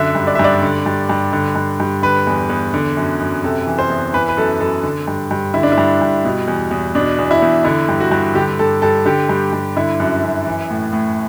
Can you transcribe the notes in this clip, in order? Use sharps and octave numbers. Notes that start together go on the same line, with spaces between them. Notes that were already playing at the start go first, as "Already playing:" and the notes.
Already playing: F#2 D3 E5
G2
D5
E5
G2 D5
D3
G2
G2
D3
G2
G2
D3 B4
E2
E2
D3
F#2
F#2
C3 A4
E3
C5
E2
E3 B4
B4
F#2 A4
F#2 A4
D3
G2
G2
D3 E4
D4
E4
G2
G2
B2
E2
E2
B2 D4
E2
E4
E2
D3 E4
G2
F#4
G2
D3 G4
G2 A4
G2 A4
D3 G4
G2
G2
D3 E4
F#2
F#2
E3
A2
A2